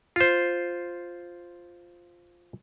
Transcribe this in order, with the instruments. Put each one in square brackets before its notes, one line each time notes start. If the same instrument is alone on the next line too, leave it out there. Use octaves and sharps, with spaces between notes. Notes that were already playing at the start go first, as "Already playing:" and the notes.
[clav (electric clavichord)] F4 C5